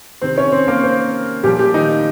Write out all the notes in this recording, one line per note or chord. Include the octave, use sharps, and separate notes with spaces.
C3 D#3 C4 C5
C#4 C#5
C4 C5
A#3 A#4
C4 C5
A#2 F3 G3 G4
G3 G4
D#3 D#4